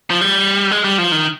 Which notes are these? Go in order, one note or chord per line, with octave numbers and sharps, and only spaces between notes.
F3
G3
G#3
G3
F3
D#3